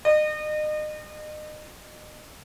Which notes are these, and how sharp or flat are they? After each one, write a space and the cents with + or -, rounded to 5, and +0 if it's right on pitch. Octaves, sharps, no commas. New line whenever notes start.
D#5 -35